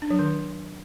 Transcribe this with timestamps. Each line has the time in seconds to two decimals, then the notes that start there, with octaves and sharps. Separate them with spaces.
0.02 D4
0.10 F#3
0.19 D#3